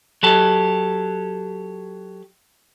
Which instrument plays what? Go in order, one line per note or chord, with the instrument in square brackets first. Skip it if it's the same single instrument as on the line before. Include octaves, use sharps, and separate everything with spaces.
[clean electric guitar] F#3 G4 A4